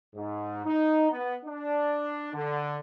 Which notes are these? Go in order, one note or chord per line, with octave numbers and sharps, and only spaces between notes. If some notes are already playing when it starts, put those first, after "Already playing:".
G#2
D#4
B3
D4
D3